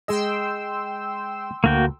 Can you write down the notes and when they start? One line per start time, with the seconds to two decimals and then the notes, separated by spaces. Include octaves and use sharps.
0.08 G#3 G#4 D#5 G5 C6 E6
1.64 D2 A#3 F#4 G5